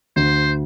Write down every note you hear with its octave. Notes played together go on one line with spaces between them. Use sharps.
D2 D3 C5